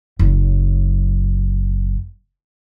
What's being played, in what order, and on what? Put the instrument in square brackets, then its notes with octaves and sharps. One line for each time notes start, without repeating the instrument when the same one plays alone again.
[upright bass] F#1 F#2